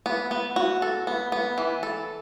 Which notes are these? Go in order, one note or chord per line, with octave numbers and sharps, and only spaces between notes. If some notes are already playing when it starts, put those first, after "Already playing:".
B3
B3
F#4
A4
B3
B3
E3
A4